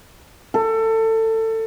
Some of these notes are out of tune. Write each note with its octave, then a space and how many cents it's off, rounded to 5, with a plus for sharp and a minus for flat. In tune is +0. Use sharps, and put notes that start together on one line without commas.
A4 +25